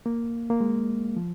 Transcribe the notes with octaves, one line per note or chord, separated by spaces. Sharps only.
A#3
A#3
G#3
F3